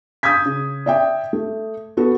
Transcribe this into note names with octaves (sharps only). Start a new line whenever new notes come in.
D#6 G6 G#6 B6
C#3
D5 E5 G5
A3
B3 F#4 A4